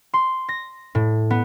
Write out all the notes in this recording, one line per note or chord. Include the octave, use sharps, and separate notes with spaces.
C6
A#6
A2
B3